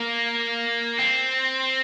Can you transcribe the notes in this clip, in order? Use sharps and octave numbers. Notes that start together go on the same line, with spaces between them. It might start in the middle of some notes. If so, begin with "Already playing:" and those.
Already playing: A#3
C4